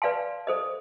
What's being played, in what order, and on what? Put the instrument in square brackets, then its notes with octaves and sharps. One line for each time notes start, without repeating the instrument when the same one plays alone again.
[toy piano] B4 D5 F5 A5 C6
A4 C5 D#5